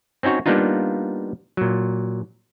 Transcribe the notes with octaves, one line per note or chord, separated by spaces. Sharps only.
C4 C#4 D#4 F#4 C#5
G3 A#3 B3 D4 D#4 F4
A#2 F#3